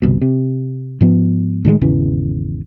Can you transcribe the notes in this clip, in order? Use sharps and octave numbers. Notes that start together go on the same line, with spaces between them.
G1 C2 B2
C3
G#2 F3 B3
A2 D#3 E3 G#3
G#1 E2 C#3 E3